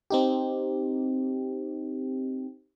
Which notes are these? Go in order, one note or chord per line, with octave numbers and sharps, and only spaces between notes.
C4 D#4 G4